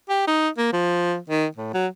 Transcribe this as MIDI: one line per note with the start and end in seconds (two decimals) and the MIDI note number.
0.09 0.24 67
0.27 0.49 63
0.58 0.71 58
0.73 1.18 53
1.30 1.46 51
1.56 1.71 45
1.74 1.87 54